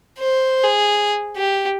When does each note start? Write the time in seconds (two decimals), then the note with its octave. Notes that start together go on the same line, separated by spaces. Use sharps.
0.19 C5
0.64 G#4
1.36 G4